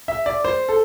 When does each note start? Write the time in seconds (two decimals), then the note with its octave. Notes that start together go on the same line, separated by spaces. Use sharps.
0.08 E5
0.26 D5
0.45 C5
0.69 A4